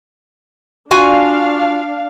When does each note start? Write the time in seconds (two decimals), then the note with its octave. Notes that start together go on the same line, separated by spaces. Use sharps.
0.91 D4 F4 F#4 F5 G#5